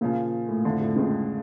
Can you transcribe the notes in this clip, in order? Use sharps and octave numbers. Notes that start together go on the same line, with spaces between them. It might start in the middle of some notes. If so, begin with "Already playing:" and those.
A#2 C#3 F3 C#4
A2
F2 A2 D3 F3
A2
C#2 C#3